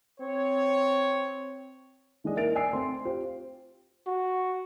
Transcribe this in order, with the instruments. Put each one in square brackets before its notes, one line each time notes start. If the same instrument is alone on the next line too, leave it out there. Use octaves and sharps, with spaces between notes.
[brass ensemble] C4 C#5
[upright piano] E3 G#3 D4 G#4 D#5
A#3 A#4 E5 A6 D7 F7
D5 G#5 E6 C7
A3 C4 C6
F4 G4 C5
[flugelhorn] F#4